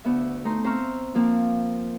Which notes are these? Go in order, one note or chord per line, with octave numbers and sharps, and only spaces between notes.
D2 B3 E5
A3 D#4 A#5 C6
C4 C5 E5 A#5 C#6 F6
F3 A#3 C4